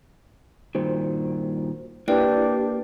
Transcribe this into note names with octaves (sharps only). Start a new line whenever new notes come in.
G2 A#2 D#3 F#4 C5
A#3 D4 E4 G4 B4 D5 G5